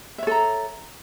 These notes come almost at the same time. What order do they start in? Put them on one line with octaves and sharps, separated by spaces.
E5 C#5 A4 A#5